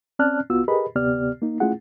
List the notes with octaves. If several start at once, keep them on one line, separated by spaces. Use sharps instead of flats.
C4 C#4 D5 A5 F6 F#6
C2 B3 F4 F#4 E6
G4 G#4 A#4 B4 D#5 B5
D2 C3 B3 G4 D5 F6
A#3 D#4
A3 C#4 E4 F4 G#4 F#5